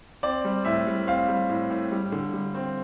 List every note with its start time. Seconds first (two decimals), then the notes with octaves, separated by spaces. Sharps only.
0.23 C4 D5
0.45 G3
0.65 A2 E5
0.87 G3
1.07 C4 F5
1.28 G3
1.50 A2
1.70 A2
1.91 G3
2.12 D3
2.33 G3
2.54 C4